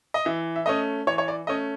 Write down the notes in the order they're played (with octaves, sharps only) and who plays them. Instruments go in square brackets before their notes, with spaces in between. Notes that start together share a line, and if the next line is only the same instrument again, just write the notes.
[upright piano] D#5
E3 E5
E5
A3 C#4 D#5
E3 C#5
C#5
D5
A3 C#4 D#5